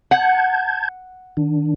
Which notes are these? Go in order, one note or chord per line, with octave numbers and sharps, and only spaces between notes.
F#5 A5 G6 G#6
D#3 D4